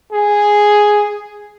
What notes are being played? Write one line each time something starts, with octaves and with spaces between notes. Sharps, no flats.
G#4